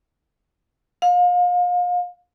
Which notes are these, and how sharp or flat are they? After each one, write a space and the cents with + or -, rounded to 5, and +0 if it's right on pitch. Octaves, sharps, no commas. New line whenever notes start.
F5 +35